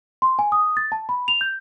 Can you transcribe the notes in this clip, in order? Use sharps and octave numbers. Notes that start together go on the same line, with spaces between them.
C6
G#5
D#6
A6
A5
B5
F7
G6